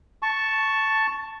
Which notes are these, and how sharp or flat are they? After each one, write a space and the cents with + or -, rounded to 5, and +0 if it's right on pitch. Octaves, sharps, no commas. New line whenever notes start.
A5 +0 C#6 +0